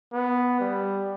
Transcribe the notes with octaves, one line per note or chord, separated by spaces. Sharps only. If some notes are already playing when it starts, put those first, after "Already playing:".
B3
G3